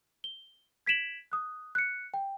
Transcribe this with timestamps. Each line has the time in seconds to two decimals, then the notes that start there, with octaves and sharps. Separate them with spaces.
0.24 G7
0.86 G#6 B6 D7 E7 F#7
1.32 D#6 F#6
1.75 F#6 C#7
2.14 G5